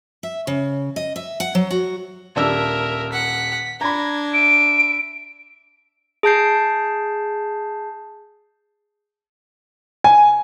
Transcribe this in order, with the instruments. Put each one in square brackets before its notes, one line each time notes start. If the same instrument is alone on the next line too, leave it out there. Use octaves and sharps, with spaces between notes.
[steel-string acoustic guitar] E5
C#3
D#5
E5
F#5
F#3
F#4
[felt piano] D#1 D4 E6 [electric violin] A#4 E5
[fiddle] F#5 [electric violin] B6
[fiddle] D4 [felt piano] A#5 B5 [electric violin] G#6 A#6
[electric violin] E5 [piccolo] D7
[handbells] G#4 A5 G6 C7
[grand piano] G#5